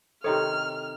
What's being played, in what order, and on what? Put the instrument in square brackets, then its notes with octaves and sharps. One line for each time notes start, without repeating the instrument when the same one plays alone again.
[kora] C3 D#3 C#5 [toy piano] A4 D#5 C6 [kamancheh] F6